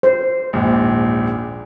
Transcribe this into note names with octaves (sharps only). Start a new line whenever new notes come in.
C5
A#1 D#2 G#2